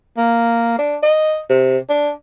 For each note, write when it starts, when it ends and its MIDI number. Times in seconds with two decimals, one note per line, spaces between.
0.17 0.74 58
0.79 0.96 62
1.03 1.40 75
1.49 1.78 48
1.89 2.11 62